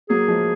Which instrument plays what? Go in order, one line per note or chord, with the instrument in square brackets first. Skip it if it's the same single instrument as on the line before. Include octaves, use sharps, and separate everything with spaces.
[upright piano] F#3 A#3 [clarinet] G#4
[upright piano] F3 G#3